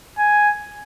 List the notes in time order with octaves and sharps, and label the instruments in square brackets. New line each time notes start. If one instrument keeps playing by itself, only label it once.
[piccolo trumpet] G#5